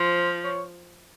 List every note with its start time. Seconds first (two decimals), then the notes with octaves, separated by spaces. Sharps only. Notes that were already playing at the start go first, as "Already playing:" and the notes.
Already playing: F3 C5
0.44 C#5